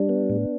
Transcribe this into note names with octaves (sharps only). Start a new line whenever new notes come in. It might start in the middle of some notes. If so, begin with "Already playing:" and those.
Already playing: G3 D4
B3
A2